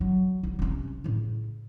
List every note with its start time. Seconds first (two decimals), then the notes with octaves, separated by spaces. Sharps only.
0.01 F#3
0.43 C2
0.59 C3 C#4
1.04 A2 C#3